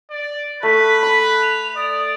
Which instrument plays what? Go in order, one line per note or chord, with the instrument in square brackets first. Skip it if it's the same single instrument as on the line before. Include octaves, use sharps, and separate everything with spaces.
[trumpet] D5
[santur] A3 [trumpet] B4 [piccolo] B6
[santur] B5
[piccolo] F7
[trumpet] D5 [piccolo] D#6